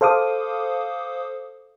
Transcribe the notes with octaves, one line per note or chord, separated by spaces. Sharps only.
A4 C5 F5 D6 D#6